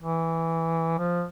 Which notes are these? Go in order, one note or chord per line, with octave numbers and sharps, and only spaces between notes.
E3
F3